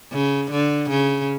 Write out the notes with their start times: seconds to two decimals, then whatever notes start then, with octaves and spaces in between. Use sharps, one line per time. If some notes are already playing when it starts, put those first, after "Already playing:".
0.12 C#3
0.51 D3
0.90 C#3